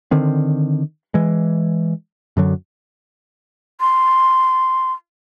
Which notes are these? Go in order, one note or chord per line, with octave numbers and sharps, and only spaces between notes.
D3 D#3 C4
E3 G#3
F#2 D3 F#3
C6